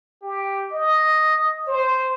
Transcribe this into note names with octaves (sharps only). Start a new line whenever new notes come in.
G4
D#5
C5